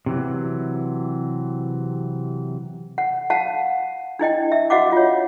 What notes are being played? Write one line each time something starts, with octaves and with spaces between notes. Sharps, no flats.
C3 E3 F#3
F#5
F5 F#5 A5
D4 E4 D#5 G5
E5
F#4 D#5 F5 F#5 D6
F4 C#5